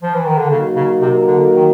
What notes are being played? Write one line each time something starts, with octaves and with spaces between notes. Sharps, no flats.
F3
E3
D#3
D3
C#3 F#3 A#3 D#4 F#4 A#4
C#3
C3
D3
D#3